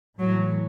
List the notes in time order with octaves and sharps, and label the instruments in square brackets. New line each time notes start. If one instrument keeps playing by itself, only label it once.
[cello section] A2 E3 F#3